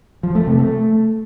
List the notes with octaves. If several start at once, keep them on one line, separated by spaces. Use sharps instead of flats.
F3
A3
C3
A3